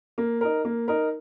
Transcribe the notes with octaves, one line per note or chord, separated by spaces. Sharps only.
A#3
D#4 A#4
A#3
D#4 A#4